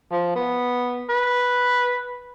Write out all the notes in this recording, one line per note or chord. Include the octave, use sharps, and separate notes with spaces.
F3
B3
B4